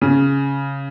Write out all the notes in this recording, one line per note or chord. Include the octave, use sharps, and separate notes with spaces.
C#3